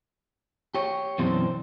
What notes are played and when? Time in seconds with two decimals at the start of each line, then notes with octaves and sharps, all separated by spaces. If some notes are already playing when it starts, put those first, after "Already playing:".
0.75 G4 C#5
1.18 F#2 B2 E3 C4 D4 C5